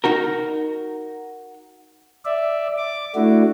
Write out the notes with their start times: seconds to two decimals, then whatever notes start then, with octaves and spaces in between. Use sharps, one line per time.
0.04 D#4 F#4 A#4
2.25 D5 E5
2.78 D6
3.15 A3 D4 E4 F#4